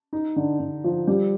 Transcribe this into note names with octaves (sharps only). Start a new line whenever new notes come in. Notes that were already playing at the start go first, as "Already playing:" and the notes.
D#4
D3
D3
F3
G3